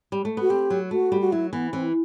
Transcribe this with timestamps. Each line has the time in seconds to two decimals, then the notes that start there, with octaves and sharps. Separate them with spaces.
0.12 G3
0.25 A3
0.37 B3 F#4
0.50 C4 G4
0.70 F#3
0.91 A3 F#4
1.12 G3
1.21 F#4
1.32 F#3 E4
1.53 E3 B3
1.73 E3 C4